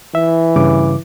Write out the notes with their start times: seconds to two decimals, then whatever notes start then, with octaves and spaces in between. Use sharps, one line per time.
0.15 E3 E5
0.56 G2 C#3 D6